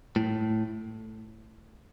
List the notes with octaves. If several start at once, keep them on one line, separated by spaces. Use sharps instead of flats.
A2